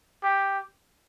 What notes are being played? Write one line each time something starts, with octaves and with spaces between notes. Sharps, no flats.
G4